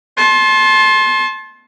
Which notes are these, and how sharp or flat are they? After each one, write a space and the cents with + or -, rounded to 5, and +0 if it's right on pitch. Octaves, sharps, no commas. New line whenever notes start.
A5 -25 C6 +25